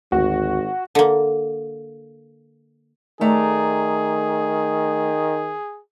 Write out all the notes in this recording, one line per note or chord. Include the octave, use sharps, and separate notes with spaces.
G#1 D2 F#4
D3 A#3
D#3 A3 G#4 D5 A#5